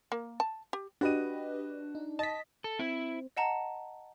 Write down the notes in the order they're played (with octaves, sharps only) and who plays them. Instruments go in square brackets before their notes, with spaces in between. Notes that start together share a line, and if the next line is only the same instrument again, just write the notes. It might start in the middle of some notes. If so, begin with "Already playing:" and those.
[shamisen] A#3
A5
G4
[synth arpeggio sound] D4 [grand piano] F#4 D#7 [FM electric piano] G4 B4 D#5
[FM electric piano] D#4
[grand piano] D#5 [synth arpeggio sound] A5 B6
[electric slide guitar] A4
[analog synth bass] C4 [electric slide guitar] E4
[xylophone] D#5 F#5 A5 A#5